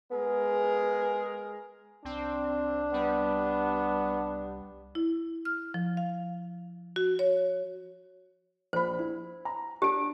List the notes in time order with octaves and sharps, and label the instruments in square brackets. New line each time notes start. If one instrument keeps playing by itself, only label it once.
[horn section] G#3 G#4 A#4 [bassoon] B3
[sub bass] C2 [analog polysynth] C4 [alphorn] D4
[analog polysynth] G3 [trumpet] B3
[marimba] E4
F6
F3
F5
F#4
C#5
[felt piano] A#1 B5 [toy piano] C5
[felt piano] E4
A#5
[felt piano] D4 D7 [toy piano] G4